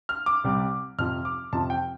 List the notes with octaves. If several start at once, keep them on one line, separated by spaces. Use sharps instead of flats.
F6
D6
C2 C3 G3
F2 C3 F3 F6
D6
F2 C3 F3 A5
G5